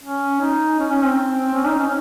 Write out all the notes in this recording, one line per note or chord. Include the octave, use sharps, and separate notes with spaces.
C#4
D#4
C#4
C#4
C4
C#4
D#4
C#4